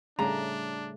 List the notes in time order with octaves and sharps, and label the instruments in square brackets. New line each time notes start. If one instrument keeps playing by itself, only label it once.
[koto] A2 C#3 [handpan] G3 A3 [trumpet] D4 [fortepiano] A#5